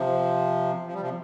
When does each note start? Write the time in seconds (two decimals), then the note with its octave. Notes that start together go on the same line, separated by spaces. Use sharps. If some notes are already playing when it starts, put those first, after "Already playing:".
Already playing: C3 F3
0.87 F3
0.94 G3
1.01 C3 F3